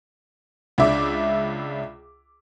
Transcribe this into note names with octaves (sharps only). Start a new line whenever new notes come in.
C#2 D4 E5 D6